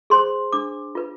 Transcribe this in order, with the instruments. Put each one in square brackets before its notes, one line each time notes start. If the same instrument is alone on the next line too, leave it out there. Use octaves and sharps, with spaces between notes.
[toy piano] G#4 C5 C6
D4 D6
F4 B4